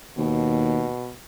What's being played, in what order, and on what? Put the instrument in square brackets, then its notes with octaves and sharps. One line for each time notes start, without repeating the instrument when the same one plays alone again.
[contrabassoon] D#2 [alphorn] B2